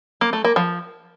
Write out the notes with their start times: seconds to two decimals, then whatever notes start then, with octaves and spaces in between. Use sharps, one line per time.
0.21 A#3
0.33 A3
0.44 A#3
0.56 F3